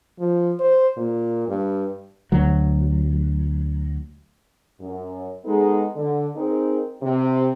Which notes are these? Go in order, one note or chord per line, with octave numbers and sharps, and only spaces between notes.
F3
C5
A#2
G2
D2 F#3
F#2
G#3 B3 D#4 G#4 A4
D3
C4 D#4 G#4 A#4
C3